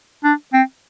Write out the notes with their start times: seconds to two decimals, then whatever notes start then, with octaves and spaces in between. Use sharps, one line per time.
0.24 D4
0.53 C4